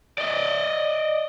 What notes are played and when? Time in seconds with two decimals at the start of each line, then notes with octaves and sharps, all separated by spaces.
0.18 D5 D#5